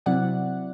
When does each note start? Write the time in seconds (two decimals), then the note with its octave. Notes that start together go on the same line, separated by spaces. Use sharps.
0.06 C3 F#3 C4 E4 D5 F#5